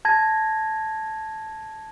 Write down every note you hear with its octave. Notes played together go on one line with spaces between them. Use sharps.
A5 G#6 A#6